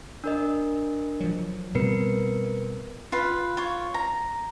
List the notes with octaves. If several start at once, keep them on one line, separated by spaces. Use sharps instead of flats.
D4 A#4 D#5
F3 F#3
B2 G3 C4 A#4 B4 C#7
F4 B4
F4 C#5
A#5